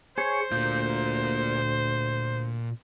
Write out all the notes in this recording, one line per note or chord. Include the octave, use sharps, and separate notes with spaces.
G#4 C5 C#5
D2 A#2 F4 G6